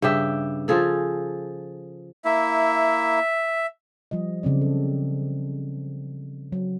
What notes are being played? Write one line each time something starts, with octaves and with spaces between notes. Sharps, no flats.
G2 C#3 G4 E5
F3 F4 G#4 A4
A#3 E4 E5
F3 G3 D#5
C#3 F#3 C4 D5
A4
F#3